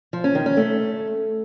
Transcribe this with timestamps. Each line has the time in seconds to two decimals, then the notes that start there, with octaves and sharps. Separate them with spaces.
0.13 F3
0.24 C#4
0.35 D#3
0.46 C#4
0.57 A3